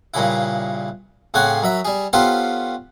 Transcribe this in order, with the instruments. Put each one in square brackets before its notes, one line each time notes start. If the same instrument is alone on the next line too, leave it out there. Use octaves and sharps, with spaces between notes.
[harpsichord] G2 A#2 C#3 E4
A2 C#3 C4 C#5 F#5 G#5
F#2 F#3 E5 B5
G3 G#4
B3 C#4 F4 G4 A4 C5